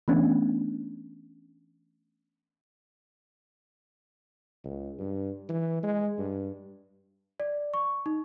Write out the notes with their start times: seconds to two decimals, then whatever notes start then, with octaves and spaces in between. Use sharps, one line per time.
0.08 E3 A3 B3 C#4 D4
4.64 C#2
4.99 G2
5.49 E3
5.83 G#3
6.18 G2
7.40 D5
7.74 C#6
8.06 D#4